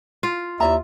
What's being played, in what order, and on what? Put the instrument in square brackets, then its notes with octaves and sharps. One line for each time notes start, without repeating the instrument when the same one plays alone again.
[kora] F4
[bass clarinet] D#2 [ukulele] E4 D5 A#5 [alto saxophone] E5